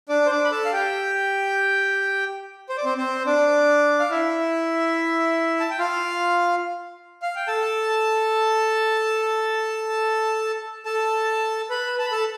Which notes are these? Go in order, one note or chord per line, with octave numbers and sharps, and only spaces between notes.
D4 D5
C5
D4 D5
B5
A4 A5
F5
G4 G5
C5
D5
C4 C5
C4 C5
D4 D5
F5
E4 E5
A5
G5
F4 F5
F5
G5
A4 A5
A4 A5
B4 B5
A5
B5
A4 A5